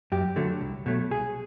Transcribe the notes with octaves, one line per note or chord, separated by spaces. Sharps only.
F#2 G4
D3 F#3 A3
C2
B2 F#3 A3
C2 G#4